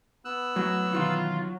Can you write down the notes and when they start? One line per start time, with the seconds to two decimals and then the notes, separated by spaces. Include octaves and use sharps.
0.25 B3 E6 F#6
0.56 F#2 A2 F#3
0.92 B2 D#3 E3 F4